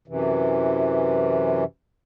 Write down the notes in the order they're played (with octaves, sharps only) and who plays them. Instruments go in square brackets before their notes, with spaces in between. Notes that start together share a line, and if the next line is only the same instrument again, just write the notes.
[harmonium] F#2 C3 E3